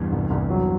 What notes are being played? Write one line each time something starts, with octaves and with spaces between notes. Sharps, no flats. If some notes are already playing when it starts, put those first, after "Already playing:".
Already playing: E2 G2
C2
C2
F#3